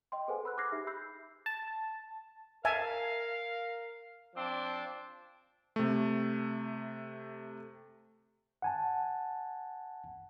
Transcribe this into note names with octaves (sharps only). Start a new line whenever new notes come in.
D#5 G5 C6
G#4 A4 B4 C5 F#5 G#5
B5 E6 F#6
D6 F6 F#6 G#6 A#6 C7
D#4 G4 G#4 E5
B5 E6 G6 C7
A5
A#4 E5 F5 G#5 A5
F3 C4 D4
C3 A3
F#5 G#5 A5